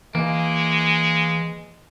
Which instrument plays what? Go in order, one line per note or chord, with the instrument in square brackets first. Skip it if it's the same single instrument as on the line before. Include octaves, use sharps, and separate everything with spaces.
[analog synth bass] E3 [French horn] G#3 [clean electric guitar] A#3